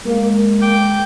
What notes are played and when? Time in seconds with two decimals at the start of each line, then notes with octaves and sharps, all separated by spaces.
0.05 G#3 A#3
0.62 G5 D6 G6